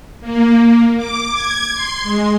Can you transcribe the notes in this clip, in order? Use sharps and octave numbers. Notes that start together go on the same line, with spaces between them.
A#3
A#3
D6
G#6
C6
G#3